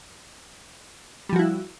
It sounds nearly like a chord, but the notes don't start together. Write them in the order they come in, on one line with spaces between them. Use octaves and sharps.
G3 F3 F#4 E4